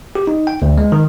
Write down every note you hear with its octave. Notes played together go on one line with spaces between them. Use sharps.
G4
D#4
G5
D2
G#3
D#3